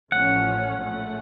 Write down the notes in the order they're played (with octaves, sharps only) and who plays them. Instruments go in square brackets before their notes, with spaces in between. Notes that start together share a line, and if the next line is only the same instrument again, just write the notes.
[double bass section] A1 A2 F3 A3 C#4 [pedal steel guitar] F#5
[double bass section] A#1 A2 A3 C#4